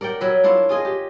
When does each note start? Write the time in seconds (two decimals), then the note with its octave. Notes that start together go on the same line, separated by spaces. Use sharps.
0.01 A#4 D5 F#5 G5
0.21 F#3 A#4 B4 E5
0.44 D4 E4 F4 C#5
0.69 F4 G#4 D#5
0.85 G4